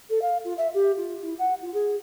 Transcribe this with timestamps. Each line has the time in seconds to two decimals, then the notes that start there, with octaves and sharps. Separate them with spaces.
0.09 A4
0.21 F5
0.44 F4
0.57 E5
0.74 G4
0.97 F4
1.22 E4
1.38 F#5
1.62 F4
1.74 G#4